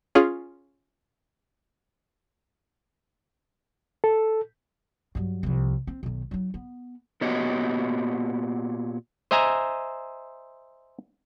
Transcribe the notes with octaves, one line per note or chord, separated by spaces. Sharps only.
C#4 F4 G#4
A4
G2 F#3
C2 F3
C4
B1 D#3
F#3 D#4
B3
A#2 B3 F#4 G4 C#5 D#5
C5 D#5 E5 G#5 A#5